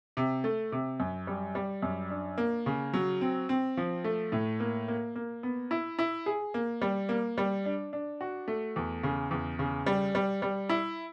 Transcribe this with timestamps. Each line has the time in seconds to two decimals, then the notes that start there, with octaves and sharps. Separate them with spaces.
0.17 C3
0.44 A3
0.72 C3
1.00 F#2
1.27 G3
1.55 G3
1.82 F#2
2.10 D4
2.38 A#3
2.66 C#3
2.94 F#3
3.21 C4
3.49 C4
3.77 F3
4.04 A3
4.32 A2
4.60 A#3
4.88 A#3
5.15 A#3
5.43 B3
5.71 E4
5.99 E4
6.26 G#4
6.54 A#3
6.82 G3
7.09 A#3
7.38 G3
7.65 D4
7.93 D4
8.21 F#4
8.48 A3
8.76 E2
9.03 C#3
9.31 E2
9.59 C#3
9.86 G3
10.15 G3
10.42 G3
10.69 E4